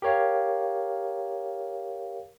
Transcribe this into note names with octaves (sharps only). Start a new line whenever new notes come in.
G4 A#4 C#5 F5